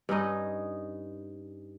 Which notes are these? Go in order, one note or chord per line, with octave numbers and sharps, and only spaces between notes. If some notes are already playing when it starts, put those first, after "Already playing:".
G2 C#4 D#4 D#5